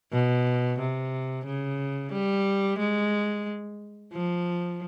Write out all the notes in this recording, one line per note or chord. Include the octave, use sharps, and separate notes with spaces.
B2
C3
C#3
G3
G#3
F3